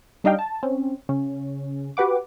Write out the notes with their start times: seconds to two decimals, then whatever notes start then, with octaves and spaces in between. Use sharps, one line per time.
0.24 G3 D4 D#4 D#5 F5 G5
0.39 A5
0.63 C4 C#4
1.09 C#3 C#4
1.97 F#4 G4 B4 F#5 D6